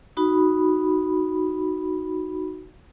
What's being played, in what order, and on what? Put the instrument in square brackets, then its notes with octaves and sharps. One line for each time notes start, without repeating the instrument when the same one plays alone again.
[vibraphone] D#4 F#4 B5